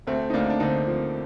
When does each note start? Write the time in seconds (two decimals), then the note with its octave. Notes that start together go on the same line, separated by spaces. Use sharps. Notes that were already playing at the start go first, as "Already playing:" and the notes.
0.07 D2 A3 C4
0.30 D#4
0.34 D2 A#3 D4
0.50 D4
0.60 D3 C4 D#4
0.87 F3